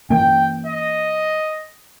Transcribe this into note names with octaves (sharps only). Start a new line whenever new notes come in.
E3 A#3 C#4 G5
D#5